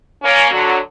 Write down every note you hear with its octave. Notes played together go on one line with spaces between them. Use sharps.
A#3 C#4
D3 F#3